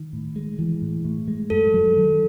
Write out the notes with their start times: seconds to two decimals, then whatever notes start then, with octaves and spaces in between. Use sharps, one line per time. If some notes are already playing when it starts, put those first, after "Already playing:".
Already playing: D#3
0.13 A2
0.36 G#3
0.59 E3
0.82 A2
1.05 A2
1.28 G#3
1.50 F#2 A4
1.74 F#3
1.97 D#3